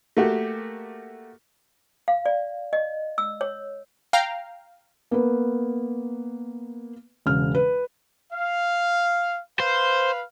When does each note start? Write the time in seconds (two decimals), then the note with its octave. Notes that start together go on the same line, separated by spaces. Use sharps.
0.17 A3 A#3 F#4 G4
2.08 F5
2.26 D5
2.73 D#5
3.18 E6
3.41 C#5
4.13 F5 G5 A#5 F6
5.11 A#3 B3 B4
7.26 E1 C#3 F6
7.55 B4
8.33 F5
9.60 B4 C5 F5